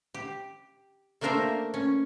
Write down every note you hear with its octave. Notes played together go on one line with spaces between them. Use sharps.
G4
A3 A#3 D4 A#4 C5 E5
C#4